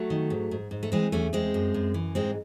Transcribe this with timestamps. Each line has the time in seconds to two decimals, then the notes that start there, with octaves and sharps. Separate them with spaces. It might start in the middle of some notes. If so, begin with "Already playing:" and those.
Already playing: F#3 A3
0.10 D#3
0.30 G#2
0.51 G#2
0.71 G#2
0.83 A3
0.92 E3 G#3 C4
1.12 E2 A3 C#4
1.33 E2 G#3 C4
1.54 F#2
1.74 F#2
1.94 E3
2.15 G#2 G#3 C4